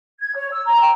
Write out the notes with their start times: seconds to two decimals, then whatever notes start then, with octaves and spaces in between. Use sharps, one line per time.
0.20 G#6
0.36 C#5
0.52 E6
0.66 A#5
0.82 G5